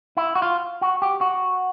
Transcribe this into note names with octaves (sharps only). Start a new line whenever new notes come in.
E4
F#4
F4
F#4
G4
F#4